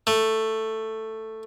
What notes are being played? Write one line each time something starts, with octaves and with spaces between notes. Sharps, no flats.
A3